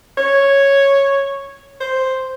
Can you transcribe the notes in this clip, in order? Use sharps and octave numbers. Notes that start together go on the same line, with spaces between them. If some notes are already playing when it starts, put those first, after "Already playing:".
C#5
C5